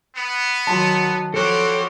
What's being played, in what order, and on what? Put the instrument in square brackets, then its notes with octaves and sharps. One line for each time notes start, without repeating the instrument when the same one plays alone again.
[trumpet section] B3
[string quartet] D#3 F#3 [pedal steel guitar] A5 C6
[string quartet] F3 F#4 C#5 [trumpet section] G3 C4 [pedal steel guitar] A4 F#6